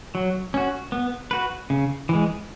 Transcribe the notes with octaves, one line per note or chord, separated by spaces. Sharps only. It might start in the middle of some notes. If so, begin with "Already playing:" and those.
F#3
C#4 F#4
B3
F#4 B4
C#3
E3 G#3